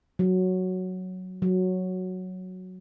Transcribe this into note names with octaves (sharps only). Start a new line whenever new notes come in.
F#3
F#3